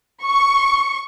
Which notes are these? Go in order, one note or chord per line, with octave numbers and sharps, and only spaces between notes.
C#6